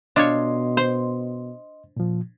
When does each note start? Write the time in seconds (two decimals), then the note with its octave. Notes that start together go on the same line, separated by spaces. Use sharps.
0.16 B2 D4 F4 C#5 D#5 C6
0.77 C5
1.97 A#2 F3